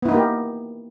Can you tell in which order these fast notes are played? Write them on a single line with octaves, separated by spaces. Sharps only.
B3 E4 D#4 A#3 G4